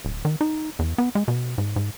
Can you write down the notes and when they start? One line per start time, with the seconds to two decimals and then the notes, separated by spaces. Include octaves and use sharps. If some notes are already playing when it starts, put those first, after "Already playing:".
0.05 D1
0.25 D#3
0.41 D#4
0.79 E2
0.98 B3
1.15 G#3
1.28 B2
1.58 G#2
1.76 G#2